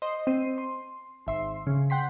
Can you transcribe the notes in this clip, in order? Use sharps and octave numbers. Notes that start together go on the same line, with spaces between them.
C5 D#5 C7
C4 C6 C7 D#7
C6
G#1 E5 C6 C7
C#3
F#5 G5 C6 B6